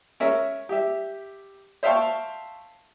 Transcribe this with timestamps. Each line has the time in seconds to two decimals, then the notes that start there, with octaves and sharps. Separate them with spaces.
0.20 C#4 A#4 E5
0.69 G4 E5
1.83 C5 E5 F5 G5 A5 C#6